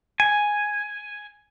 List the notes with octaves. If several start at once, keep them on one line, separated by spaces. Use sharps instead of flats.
G#5